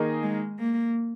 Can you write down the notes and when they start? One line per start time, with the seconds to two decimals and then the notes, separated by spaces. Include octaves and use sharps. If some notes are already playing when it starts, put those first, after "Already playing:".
Already playing: D#3 A#3 D#4 G#4 D#5
0.22 G#3
0.58 A#3